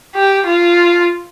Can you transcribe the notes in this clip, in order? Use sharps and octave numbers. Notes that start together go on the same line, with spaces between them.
G4
F4